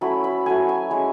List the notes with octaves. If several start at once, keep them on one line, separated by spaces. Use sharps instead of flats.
F#3 A3 C#4 E4 B5
B5
F#3 A3 E4 G#5
G#5
G#3 C#4 E4